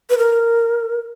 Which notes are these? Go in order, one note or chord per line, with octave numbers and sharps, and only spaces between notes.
B4
A#4